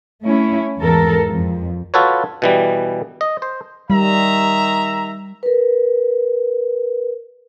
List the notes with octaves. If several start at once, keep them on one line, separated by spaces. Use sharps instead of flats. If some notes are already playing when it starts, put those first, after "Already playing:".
A3 C#4 E4
E2 G#2 A4 A#4
F2 F3
F4 F#4 A4 B4 C#5
B2 E3 G3
D#5
C5
D#3 G3 E5 A#5
A#4 B4